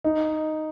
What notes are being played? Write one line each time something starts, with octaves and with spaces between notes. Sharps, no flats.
D#4